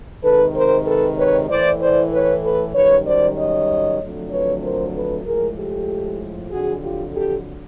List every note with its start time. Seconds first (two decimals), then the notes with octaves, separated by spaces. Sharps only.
0.24 C3 D#3 G#3 A4 B4
0.55 A#4 C5
0.86 A4 B4
1.18 B4 C#5
1.49 A2 E3 A3 C5 D5
1.80 C5 D5
2.12 B4 C#5
2.43 A4 B4
2.74 F#2 D#3 G3 B4 C#5
3.06 C5 D5
3.37 C#5 D#5
4.00 F2 D3 F#3 A3
4.31 B4 C#5
4.62 A#4 C5
4.94 A4 B4
5.25 A2 F3 G#3 G#4 A#4
5.57 G4 A4
6.50 F2 D3 F#3 F#4 G#4
6.82 F4 G4
7.14 G4 A4